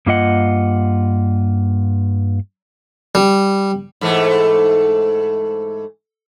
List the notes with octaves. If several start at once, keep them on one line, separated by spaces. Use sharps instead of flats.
G2 A#3 F4 D#5 F#5
G3
G#2 E3 A3